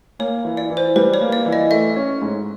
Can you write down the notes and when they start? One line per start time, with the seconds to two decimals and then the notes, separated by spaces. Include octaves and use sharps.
0.19 A#3 C#5
0.45 E3
0.57 D5
0.70 E3
0.77 C5
0.96 G3 B4
1.14 C#5
1.21 A#3
1.32 D5
1.46 E3
1.53 D#5
1.71 A3 E5
1.96 C#4
2.22 G#2